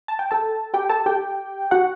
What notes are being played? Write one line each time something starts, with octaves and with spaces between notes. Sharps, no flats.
A5
G5
A4 A5
G4 G5
A4 A5
G4 G5
F#4 F#5